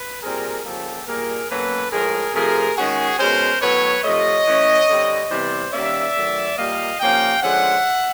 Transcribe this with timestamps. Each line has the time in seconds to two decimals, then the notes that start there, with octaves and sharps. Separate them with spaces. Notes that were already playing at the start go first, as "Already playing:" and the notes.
Already playing: B4
0.23 A#2 G3 C4 G#4 A#4
0.65 C#3 F3 A#3 G4 A4
1.08 A#2 G3 A#3 G#4 A#4
1.50 B2 F#3 A#3 C#4 A4 B4
1.92 A2 F3 G#3 G#4 A#4
2.34 C3 F3 A3 G#4 A#4
2.77 D#3 G#3 C#4 F#4 G#4
3.19 B2 G#3 C#4 A#4 C5
3.62 A2 F#3 B3 B4 C#5
4.04 C3 F3 A3 C#5 D#5
4.47 E3 A3 C#4
4.89 D3 G3 C4
5.31 C3 E3 G3 B3 C5 D5
5.73 D#3 G3 A#3 C#4 D5 E5
6.16 D#3 F#3 A3
6.58 A#2 G3 A#3 D#5 F5
7.00 C3 F3 A#3 C#4 F5 G5
7.43 D3 F3 G#3 C#4 E5 F#5